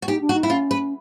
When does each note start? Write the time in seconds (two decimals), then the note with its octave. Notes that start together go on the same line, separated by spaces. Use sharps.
0.02 F#4
0.08 D#4 G4
0.21 D4
0.29 F#4
0.34 D#4
0.43 E4
0.49 C#4 F4
0.71 B4